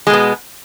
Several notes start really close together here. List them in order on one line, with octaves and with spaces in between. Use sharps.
G#3 B2 B3